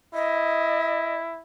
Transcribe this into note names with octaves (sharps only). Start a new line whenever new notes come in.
E4 D#5